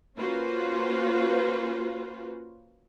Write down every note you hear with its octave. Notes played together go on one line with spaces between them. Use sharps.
A#3 C#4 F4 F#4 B4 C5